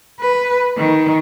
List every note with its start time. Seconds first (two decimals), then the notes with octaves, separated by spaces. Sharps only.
0.20 B4
0.78 D#3